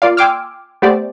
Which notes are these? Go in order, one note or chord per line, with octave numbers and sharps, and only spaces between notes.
A#3 F4 D5 F5
G5 G#5 C6 D6 E6 F6
A3 B3 G4 C5 D5